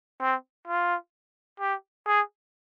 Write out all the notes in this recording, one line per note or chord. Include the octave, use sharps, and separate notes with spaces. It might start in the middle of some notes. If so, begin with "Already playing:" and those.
C4
F4
G4
G#4